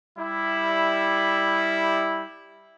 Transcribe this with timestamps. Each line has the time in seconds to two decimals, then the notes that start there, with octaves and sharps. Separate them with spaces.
0.18 G3 E4